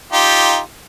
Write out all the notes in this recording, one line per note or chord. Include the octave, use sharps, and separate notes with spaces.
D#4 F4 G4